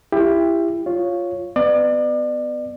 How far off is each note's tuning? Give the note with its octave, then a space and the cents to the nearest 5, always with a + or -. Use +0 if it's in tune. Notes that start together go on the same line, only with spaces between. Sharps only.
E4 +25 G4 +20
F4 +0 C#5 +0
B3 +25 D5 +35